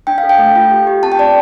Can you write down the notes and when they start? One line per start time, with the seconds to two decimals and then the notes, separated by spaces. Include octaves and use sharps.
0.07 D4 G5
0.18 F5
0.23 A4
0.29 G5
0.38 A3
0.56 F4
0.70 G4
0.87 G4
1.03 C4 A5
1.12 G5
1.19 C4 D5